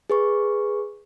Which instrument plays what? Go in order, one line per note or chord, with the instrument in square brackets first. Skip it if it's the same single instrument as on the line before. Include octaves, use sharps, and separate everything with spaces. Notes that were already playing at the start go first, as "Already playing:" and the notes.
[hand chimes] G#4 B4 C#6